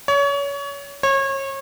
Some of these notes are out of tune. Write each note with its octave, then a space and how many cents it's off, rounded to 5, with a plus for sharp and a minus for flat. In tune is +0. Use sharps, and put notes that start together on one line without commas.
C#5 +30
C#5 -30